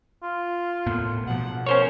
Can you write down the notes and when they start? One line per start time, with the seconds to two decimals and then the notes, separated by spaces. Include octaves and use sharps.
0.23 F4
0.86 A2 B3
1.27 B2 F3 F#5
1.66 C#4 A#4 C5 C#5